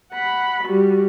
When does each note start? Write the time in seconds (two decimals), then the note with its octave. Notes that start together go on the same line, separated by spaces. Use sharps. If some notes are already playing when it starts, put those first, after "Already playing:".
0.12 F#5 B5
0.64 G3 F#4